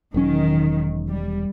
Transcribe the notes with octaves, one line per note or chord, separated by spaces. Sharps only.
E1 D#3 F#3 C#4
G3